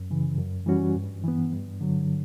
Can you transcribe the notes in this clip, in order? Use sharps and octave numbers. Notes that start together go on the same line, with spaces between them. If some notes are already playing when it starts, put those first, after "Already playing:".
Already playing: F#2
C#3 E3
F#2
E3 G3 C#4 F#4
G2
E3 B3
G2
D3 F#3